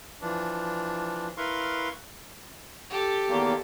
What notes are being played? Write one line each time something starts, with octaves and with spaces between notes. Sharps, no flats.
E3 F3 D4
E4 A#4 B4 F5 C6 C#6
G4 A4
E2 D#3 A#3